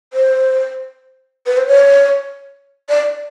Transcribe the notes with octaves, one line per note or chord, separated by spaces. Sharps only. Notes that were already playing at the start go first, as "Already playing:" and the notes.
C5
B4
C5
C#5
D5